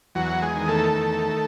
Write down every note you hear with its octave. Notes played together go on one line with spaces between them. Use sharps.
E2 F#3 F#4
G#3 G#4
D#3
A3 A4
E2